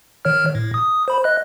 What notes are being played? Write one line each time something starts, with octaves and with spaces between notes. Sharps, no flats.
D#3 C#5 F6
A2
D#6
C5 B5
D#5 F#6